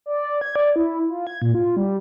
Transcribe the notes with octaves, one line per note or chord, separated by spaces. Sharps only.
D5
G#6
D5
E4
F4
G#6
A#2
F4
G3